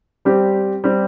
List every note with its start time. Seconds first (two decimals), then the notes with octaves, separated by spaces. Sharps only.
0.25 G3 C4 G4
0.84 G3 C4 G4